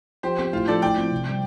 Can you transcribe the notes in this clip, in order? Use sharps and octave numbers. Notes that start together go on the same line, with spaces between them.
F3 G4 C5
C4 G4
A2 F4
F3 D4 A4 D5
A2 D5 G5
F3 C4
C3
G3 C4